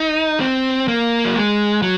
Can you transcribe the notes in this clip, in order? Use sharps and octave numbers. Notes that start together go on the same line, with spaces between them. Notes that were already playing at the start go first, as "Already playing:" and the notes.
Already playing: D#4
C4
A#3
F#3
G#3
F#3